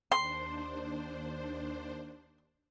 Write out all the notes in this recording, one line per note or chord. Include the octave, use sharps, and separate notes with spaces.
D#2 D4 C5 C6